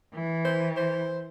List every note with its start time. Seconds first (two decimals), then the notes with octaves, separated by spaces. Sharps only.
0.14 E3
0.45 C5
0.77 C5